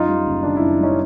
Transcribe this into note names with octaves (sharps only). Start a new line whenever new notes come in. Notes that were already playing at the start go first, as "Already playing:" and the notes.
Already playing: F#2 D#4 F4
G3
F#1
D#3 D4
D4 E4
F#2
G3 C#4 D#4